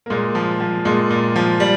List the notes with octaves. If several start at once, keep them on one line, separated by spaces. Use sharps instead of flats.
A#3
A#2 G#3
F3
F3
A#2 G#3
A#2
F3
G3